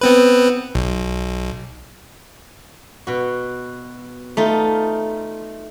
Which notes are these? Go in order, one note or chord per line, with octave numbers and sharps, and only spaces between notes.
B3 C4 B4
B1
B2 F#4
A3 D#4 F4